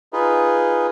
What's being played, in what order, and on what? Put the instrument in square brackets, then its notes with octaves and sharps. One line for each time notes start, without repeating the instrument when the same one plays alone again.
[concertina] D#4 F4 G#4 B4